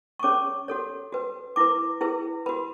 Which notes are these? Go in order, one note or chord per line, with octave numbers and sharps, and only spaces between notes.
C#6
C#4 G#4 C#5 D6
F#4 A4 C#5
F#4 B4
E4 B4 D6
E4 G#4 B4
F#4 B4 B5